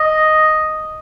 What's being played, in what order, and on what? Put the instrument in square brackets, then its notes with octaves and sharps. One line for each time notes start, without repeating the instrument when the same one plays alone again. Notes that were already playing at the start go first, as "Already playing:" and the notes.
Already playing: [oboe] D#5